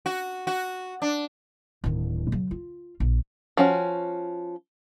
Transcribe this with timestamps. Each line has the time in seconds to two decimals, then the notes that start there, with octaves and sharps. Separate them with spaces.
0.06 F#4
0.47 F#4
1.02 D4
1.84 D1 D#3
2.32 C#3 F#3
2.51 F4
3.00 A#1
3.57 F3 C#4 F#4